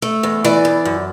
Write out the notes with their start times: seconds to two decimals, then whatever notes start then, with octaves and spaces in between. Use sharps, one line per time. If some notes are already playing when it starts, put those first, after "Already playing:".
0.02 A3
0.23 E2
0.44 E3 D5
0.65 E2
0.85 F#2